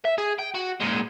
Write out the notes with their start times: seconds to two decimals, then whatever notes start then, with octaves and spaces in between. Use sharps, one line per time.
0.05 E5
0.18 G#4
0.39 G5
0.55 F#4
0.81 A#2 G#3